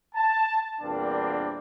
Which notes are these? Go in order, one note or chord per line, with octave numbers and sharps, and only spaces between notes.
A5
E2 A#2 G3 A#3 C4 D4